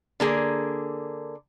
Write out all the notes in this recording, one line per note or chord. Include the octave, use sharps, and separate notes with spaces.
D3 A#3 G#4